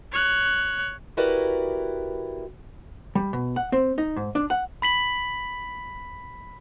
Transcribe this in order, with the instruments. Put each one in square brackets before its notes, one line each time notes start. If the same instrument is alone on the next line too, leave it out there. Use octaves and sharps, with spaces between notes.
[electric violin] C#5 F#6
[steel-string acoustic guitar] E4 F#4 G4 A#4 B4 D5
[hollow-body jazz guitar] G3
B2
F#5
C4
D#4
G#2
D4
F#5
[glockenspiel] B5 B6 F#7